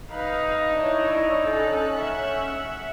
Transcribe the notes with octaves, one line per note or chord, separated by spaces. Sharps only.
D#4 B4 F5
D4 E4 C#5
C#4 A4 F#6
E5 F#5